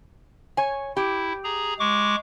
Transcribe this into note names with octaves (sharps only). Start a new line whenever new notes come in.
C#5 G#5
E4 G4
G#4 A#5
G#3 C#6 D6